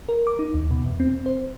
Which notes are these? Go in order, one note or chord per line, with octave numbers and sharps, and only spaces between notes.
A#4
D6
D#4
D#2
B2
E2
C4
C5